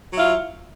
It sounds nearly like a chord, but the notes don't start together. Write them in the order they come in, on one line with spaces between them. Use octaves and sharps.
F#3 E4 F4